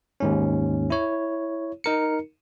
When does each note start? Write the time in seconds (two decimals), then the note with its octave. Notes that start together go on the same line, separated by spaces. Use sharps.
0.20 D#2 G#2 C#4
0.90 E4 C#5
1.84 D#4 A#4 C#7